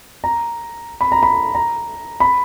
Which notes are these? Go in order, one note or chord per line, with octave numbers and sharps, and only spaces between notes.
A#5
B5
A#5
B5
A#5
B5